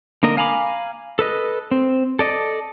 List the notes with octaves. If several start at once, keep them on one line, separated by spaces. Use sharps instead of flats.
D3 A#3 A#4 D#5
F5 G#5 A#5 B5 D6
A4 B4 D#5
C4
A4 D5 D#5